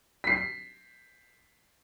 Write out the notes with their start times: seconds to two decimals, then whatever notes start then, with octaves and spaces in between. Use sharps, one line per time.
0.24 B6 C7